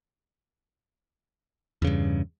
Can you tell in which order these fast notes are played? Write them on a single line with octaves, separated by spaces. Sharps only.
E2 C#3 G2